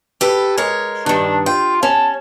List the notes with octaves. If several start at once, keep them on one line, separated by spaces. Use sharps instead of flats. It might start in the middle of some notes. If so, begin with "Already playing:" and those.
G4 A4 B4
G#3 A#4 C#5
G2 D#3 D4
F4 G5
C#4 A5